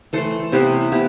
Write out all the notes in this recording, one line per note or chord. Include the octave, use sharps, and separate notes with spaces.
E3 A3 A4 C5
C3 E3 B3 E4 G4
B3 E4 G4